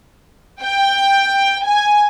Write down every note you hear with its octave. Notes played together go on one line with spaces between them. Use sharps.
G5
G#5